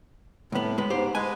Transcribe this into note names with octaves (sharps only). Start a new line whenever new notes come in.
C2 A2 B3
G#3 B3
G#2 G4 C5
G#3 B4 G#5